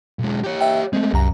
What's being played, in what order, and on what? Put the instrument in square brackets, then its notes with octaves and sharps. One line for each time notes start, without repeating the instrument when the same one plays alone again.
[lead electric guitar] B1 G#3
G4 C#5
[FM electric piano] E5 G5
[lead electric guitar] G#3 A3 [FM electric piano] C4
[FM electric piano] C2 A#5 [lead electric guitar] F#2